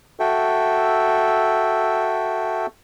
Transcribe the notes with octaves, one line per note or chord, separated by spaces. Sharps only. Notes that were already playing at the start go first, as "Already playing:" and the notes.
F#4 A4 E5 G5